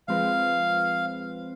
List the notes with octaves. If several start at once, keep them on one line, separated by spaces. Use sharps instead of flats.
F3 G#3 C4 F4 B4 F5